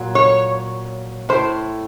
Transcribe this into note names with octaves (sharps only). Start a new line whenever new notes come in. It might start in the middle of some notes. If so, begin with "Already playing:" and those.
Already playing: A#2 F#3
C#5
A2 C5